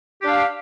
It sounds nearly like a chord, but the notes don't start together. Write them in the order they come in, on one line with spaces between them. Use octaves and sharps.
G4 D4 F5